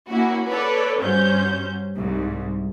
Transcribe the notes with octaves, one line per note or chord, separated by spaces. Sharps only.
A#3 C#4 E4 F#4
A4 B4 C#5 D5
G2 F#3 C#4 C5 G6
C2 G#2